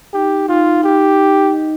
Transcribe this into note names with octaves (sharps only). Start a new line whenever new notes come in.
D#4 G4
D#4 F4
D#4 G4
D#4
D#5